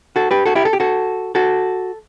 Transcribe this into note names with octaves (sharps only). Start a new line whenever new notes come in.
F#4 A4
G4 B4
F#4 A4
E4 G4
A4
G4
F#4 A4
F#4 A4